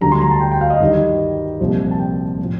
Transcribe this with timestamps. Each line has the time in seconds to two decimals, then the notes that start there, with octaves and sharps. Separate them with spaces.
0.01 D2 D3 G3 A#5
0.12 C6
0.22 A#5
0.31 A5
0.40 G5
0.52 G5
0.61 F5
0.70 D#5
0.80 G2 D#3 G3 D#5
1.60 C2 A#2 F3
1.91 A5
1.99 G5
2.39 A2 F3